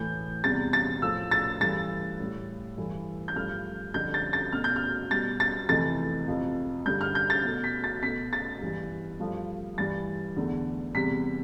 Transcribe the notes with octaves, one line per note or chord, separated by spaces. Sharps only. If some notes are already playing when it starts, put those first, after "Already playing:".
Already playing: A2 E3 A3 G6
E2 C3 G3 A6
A6
A2 F3 A3 E6
A6
G2 E3 A3 A6
A2 G3
G2 E3 A3
G6
G2 F3 A3 F6
F2 D3 G3 G6
A6
A6
B2 A3 F6
G6
F6
B2 G3 A6
A6
F2 C3 E3 A3 A6
F2 C3 F3
G2 D3 G3 G6
F6
G6
A6
B2 A3
B6
A6
B2 A3 B6
A6
G2 E3 G3
G2 F3 A3
G2 E3 G3 A6
E2 D3 A3
E2 C3 G3 B6